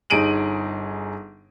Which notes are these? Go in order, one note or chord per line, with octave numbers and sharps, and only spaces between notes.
G1 D#4 G#4 D7 D#7 F#7